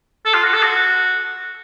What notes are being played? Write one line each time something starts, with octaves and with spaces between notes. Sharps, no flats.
A4
F4
F#4
A4
F#4